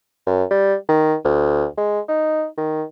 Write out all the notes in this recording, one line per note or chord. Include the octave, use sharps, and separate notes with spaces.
F#2
G3
D#3
D2
G#3
D#4
D#3